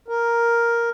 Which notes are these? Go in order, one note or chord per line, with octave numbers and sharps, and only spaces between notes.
A#4